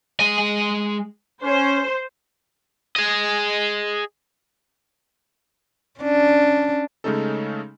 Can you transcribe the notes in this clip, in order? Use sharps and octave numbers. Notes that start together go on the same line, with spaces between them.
G#3 G#5
C#4 C5
G#4 D#5
C#4 D4
C#3 G#3 A3 C#4 D#4 A4